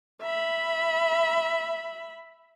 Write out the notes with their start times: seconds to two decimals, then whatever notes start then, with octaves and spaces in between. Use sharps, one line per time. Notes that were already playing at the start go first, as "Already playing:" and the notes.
0.22 E5 B5